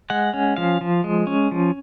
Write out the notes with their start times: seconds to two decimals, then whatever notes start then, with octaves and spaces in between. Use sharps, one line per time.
0.10 G#3 F#5
0.34 C#4
0.57 F3 F5
0.81 F3
1.04 G#3
1.27 C#4
1.51 F3